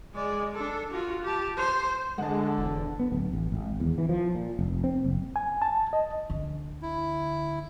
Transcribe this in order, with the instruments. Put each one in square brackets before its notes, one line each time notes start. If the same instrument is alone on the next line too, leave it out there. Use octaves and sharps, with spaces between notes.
[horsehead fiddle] G#3 D5
D4 A4
F4 F#4
G4 A5
C5
[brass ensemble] D3 [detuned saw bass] G#3 [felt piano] F#5 A5
[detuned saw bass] E1
[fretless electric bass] B3
D1
A1
G#1
E2
E3
F3
A#2
F1
C4
F#1
[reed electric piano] G#5
A5
D#5
[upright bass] D2 D3
[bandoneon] E4